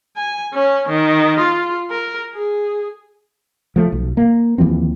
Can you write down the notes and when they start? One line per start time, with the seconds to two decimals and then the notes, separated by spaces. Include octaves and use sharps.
0.17 G#5
0.54 C#4
0.89 D#3
1.39 F4
1.90 A#4
2.34 G#4
3.76 F3 A3
3.92 B1
4.17 A#3
4.58 D#2 E3 F3 C4